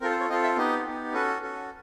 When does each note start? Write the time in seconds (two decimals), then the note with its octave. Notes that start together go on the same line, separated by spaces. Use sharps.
0.01 C4 F4 A4 A#4
0.10 C5
0.20 C#5
0.29 C4 F4 A4 D#5
0.43 E5
0.57 B3 D#4 G4 D#5
0.85 B3 D#4 G4
1.13 C#4 F#4 A4 B4
1.42 C#4 F#4 A4